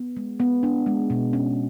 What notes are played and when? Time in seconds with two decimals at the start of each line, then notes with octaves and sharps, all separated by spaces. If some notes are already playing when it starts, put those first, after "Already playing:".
Already playing: B3
0.17 G#3
0.40 B3
0.63 D4
0.86 G#3
1.10 B2
1.33 C#4